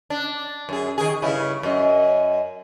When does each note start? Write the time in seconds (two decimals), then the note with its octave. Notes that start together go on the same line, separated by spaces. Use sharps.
0.10 D4
0.69 F#2 G#4
0.98 D#3 G#4
1.22 G2 C#3 E4
1.63 F#2 D#5